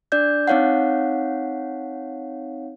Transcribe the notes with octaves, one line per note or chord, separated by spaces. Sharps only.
D4 D5 G6
C4 D#4 C#5 F5 F#5